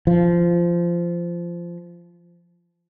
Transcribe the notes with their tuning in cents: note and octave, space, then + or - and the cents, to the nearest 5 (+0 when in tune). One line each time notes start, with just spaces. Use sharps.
F3 -15